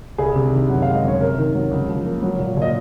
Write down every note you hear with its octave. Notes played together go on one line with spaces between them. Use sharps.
C2 G#4
C3
D#3
F#2 F#5
G#3 F5
D#5
F#2 C#5
C3 A#4
D#3
F#3
C#2
F3
A#3
F#3
A#2
A#2 D#5